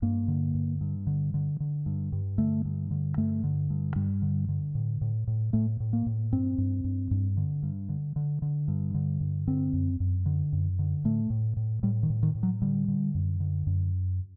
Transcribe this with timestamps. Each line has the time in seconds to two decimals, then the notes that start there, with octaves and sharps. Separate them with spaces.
0.02 G2 A#3
0.28 D3
0.54 G2
0.81 G2
1.07 D3
1.34 D3
1.60 D3
1.86 G2
2.12 G2
2.38 D3 A3
2.65 G2
2.91 D3
3.17 G2 A3
3.44 D3
3.70 G2
3.95 G2 G3
4.22 D3
4.48 D3
4.75 A2
5.01 A2
5.27 A2
5.53 A2 A3
5.80 A2
5.93 A#3
6.06 A2
6.32 G2 C4
6.58 G2
6.84 G2
7.11 G2
7.37 D3
7.63 G2
7.89 D3
8.16 D3
8.42 D3
8.68 G2
8.94 D3
9.21 G2
9.47 D3 C4
9.73 F#2
10.00 F#2
10.26 D3
10.52 F#2
10.79 D3
11.04 A2 A3
11.30 A2
11.57 A2
11.83 A2 G3
12.03 D#3
12.10 A2
12.23 D#3
12.35 A2
12.43 F#3
12.62 D3 G3
12.88 D3
13.15 F#2
13.40 D3
13.67 F#2